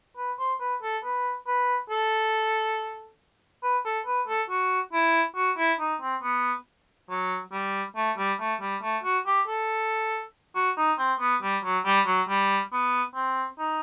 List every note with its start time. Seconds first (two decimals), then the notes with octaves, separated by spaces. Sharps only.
0.17 B4
0.39 C5
0.60 B4
0.83 A4
1.04 B4
1.47 B4
1.90 A4
3.63 B4
3.85 A4
4.06 B4
4.28 A4
4.50 F#4
4.93 E4
5.36 F#4
5.58 E4
5.80 D#4
6.01 C4
6.23 B3
7.09 F#3
7.53 G3
7.96 A3
8.18 G3
8.40 A3
8.61 G3
8.82 A3
9.04 F#4
9.26 G4
9.47 A4
10.55 F#4
10.77 D#4
10.99 C4
11.20 B3
11.42 G3
11.64 F#3
11.85 G3
12.06 F#3
12.29 G3
12.72 B3
13.15 C4
13.59 D#4